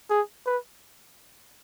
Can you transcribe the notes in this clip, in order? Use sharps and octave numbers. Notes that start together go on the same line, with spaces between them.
G#4
B4